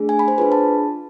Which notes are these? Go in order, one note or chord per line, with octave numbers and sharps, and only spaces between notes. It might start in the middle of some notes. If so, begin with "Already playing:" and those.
Already playing: A3 D4 G#4
G#5
B5
C5
D4 F4 G#4 B4
A5